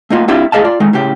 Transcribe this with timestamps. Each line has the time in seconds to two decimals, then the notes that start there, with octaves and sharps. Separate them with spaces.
0.10 A3 A#3 D#4 F4
0.28 C4 D4 E4 F4 G4
0.52 A2 G#4 D#5 F5 A5
0.64 F4 D5
0.80 D#3 G#3 A3 D#4
0.93 A2 C#3 G4